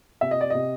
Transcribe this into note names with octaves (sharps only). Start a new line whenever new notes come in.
C3 E5
D#5
D5
C3 D#5